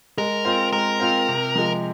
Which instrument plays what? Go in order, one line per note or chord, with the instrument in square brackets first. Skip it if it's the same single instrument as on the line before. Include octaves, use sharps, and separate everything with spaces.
[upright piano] G#3 [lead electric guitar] A#4
[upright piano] C4 F4 C5
[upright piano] G#3 [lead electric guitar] A#4
[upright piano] C4 F4 C5
C3
F3 G#3